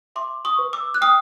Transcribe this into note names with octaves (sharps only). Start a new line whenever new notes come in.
E5 C6 D6
C#6 D#6
B4
D6 E6
F#6
G5 D#6 F6